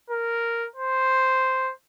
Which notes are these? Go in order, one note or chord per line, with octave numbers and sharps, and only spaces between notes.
A#4
C5